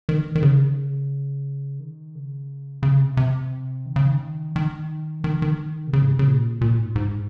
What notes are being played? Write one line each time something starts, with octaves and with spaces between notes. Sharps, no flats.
D#3
D#3
C#3
D#3
C#3
C#3
C3
C3
D#3
C#3
D#3
D#3
D#3
D#3
C3
C#3
G#2
C3
C#3
A#2
A#2
G#2
G#2